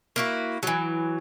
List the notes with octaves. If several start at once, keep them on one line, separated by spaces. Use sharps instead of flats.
A#3 E4 F#4
E3 F#3